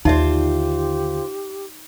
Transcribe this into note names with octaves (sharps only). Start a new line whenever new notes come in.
D#2 D3 D#4 F4 G4 C5 D5 E5